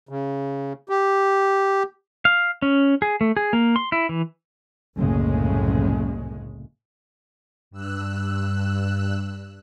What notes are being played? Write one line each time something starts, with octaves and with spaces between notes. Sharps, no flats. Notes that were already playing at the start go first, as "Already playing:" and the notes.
C#3
G4
F5
C#4
G#4
A3
G#4
A#3
C6
E4
E3
F#1 C2 A2 C#3 G#3
G2 E6 F#6